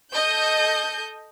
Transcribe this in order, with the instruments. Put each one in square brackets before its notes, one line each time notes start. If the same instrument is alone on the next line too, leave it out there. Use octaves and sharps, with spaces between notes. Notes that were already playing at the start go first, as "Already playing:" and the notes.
[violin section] A4 D#5 G6